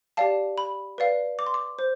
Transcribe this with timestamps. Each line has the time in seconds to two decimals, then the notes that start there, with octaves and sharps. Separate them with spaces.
0.17 G4 D5 F5 A5
0.58 B5
0.98 B4 D5 F5
1.39 D6
1.47 C6
1.54 D6
1.79 C5